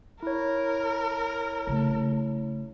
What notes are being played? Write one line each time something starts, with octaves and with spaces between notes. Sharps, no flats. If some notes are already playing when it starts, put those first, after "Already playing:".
E4 A#4 C#5
C#3 A3